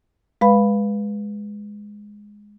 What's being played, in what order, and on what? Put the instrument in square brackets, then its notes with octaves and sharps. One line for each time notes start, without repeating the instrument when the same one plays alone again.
[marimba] G#3 B4 F5 B5